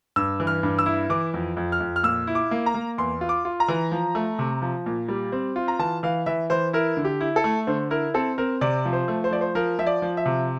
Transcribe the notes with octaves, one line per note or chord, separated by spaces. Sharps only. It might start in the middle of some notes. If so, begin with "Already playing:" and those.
G2 E6
E3
F6
G2
E6
E4
E3 D6
F2
F2
F6
F2
F6
A#2 E6
E4
D6
A#3
A#5
A#3
E2 C6
F4
D6
F4
A#5
E3
F3
A3
C3
F3
A#2
G3
C4
F4
A#5
E3 A5
E3 F5
E3 E5
E3 C5
E4 A#4
D3
G4
E4
A4
A3
D3 C5
E4 A#4
C4 A4
C4 A#4
C3 D5
F3
C5
A3
C5
F3 D5
C5
F3 A#4
F3 E5
D5
F3
E5
C3